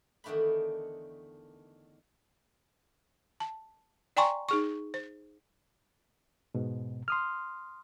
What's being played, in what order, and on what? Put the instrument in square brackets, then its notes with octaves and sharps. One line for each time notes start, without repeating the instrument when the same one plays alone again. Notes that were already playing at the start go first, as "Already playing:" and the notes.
[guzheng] E2 D3 D#3 A3 D4 B5
[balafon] A5
D5 G5 G#5 A#5 C6 C#6
D#4 G#4 C#6
C5
[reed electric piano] G#2 B2
C6 D#6 F6